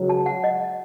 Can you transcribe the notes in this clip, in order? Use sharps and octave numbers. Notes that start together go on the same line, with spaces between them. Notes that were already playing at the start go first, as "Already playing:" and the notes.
Already playing: C#2 C#3 F#3
A5
F#5
D#5